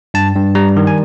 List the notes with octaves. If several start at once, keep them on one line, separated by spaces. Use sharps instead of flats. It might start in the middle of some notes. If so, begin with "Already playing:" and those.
G2 A5
G2
G3 A#5
D#3
G#5